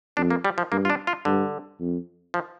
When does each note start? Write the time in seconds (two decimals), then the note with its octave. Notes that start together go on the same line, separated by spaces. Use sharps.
0.17 F2 D4
0.30 A#3
0.45 G3
0.58 F3
0.72 G2 A#3
0.85 F4
0.90 D4
1.07 F4
1.25 G2 D3
1.80 F2
2.34 F3